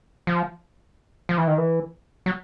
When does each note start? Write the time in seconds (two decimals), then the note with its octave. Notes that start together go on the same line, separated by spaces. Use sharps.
0.27 F3
1.29 F3
1.38 E3
1.47 D#3
1.58 E3
2.26 F#3